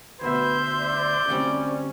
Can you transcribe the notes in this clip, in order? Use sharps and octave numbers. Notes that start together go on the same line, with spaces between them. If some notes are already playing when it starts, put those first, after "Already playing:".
D2 B2 B4 C5 E5 G6
D5
D2 G3 C4 C#4